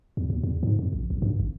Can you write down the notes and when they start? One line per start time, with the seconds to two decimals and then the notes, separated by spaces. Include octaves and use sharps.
0.17 E2
0.30 D#2
0.43 E2
0.63 G#2
0.79 F2
0.93 A#1
1.10 B1
1.22 G2
1.40 G#1